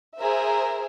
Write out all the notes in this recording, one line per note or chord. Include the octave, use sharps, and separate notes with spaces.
G#4 A#4 C5 E5